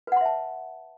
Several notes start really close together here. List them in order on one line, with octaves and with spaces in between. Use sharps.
B4 F#5 C6 E5 A5